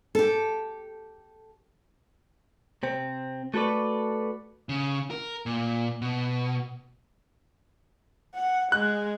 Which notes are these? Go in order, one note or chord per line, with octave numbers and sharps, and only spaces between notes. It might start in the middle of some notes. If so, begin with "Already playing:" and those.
G4 A4
C3 C4
A3 F#4 A4 B4 D5
C#3
A#4
A#2
B2
F#5
G#3 F#6